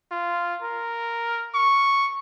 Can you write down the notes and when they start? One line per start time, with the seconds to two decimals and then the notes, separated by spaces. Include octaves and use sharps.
0.11 F4
0.62 A#4
1.54 C#6